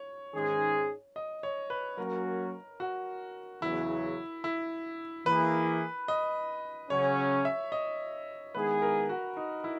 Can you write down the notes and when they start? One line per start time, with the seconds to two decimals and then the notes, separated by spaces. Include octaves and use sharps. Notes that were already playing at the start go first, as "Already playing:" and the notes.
Already playing: C#5
0.34 G#2 D#3 G#3 C#4 G#4
1.16 D#5
1.43 C#5
1.70 B4
1.98 F#3 A#3 C#4 F#4 A#4
2.80 F#4
3.62 E2 C#3 F#3 E4
4.44 E4
5.26 E3 A#3 E4 G#4 B4
6.08 D#5
6.90 C#3 F#3 C#4 C#5
7.45 E5
7.72 D#5
8.54 D#3 G#3 B3 E4 G#4 B4
8.82 A#4
9.09 F#4
9.37 D#4
9.64 E4